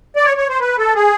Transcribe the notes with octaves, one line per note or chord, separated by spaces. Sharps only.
D5
C#5
C#5
C5
B4
A4
G#4